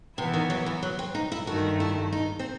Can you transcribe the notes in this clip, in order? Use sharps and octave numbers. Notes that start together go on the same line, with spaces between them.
C3 E3 B3 E4
D#3
F#3
E3
F#3
C4
D#4
E4
G2 D#3 A3 F#4
E4
D#4
C4